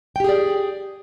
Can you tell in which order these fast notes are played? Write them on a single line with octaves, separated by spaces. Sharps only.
G5 G4 G#4 D5